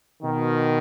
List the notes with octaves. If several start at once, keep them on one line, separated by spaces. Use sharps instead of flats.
B2 D#3